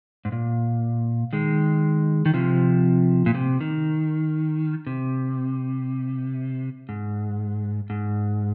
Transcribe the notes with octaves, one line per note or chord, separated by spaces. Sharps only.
G#2
A#2
D#3 G#3
D#3
C3 F3
A#2
C3
D#3
C3
G#2
G#2